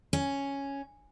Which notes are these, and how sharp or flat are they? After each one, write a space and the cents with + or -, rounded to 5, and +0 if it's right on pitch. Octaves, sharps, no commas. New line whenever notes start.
C#4 +0